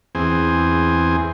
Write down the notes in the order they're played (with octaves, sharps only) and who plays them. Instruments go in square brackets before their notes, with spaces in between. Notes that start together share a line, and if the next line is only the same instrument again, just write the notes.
[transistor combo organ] E2 C4 G#4